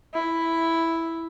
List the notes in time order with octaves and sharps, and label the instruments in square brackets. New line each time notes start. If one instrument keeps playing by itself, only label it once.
[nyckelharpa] E4